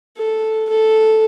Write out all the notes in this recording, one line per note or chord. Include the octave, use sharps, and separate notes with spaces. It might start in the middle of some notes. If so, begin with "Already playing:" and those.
A4
A4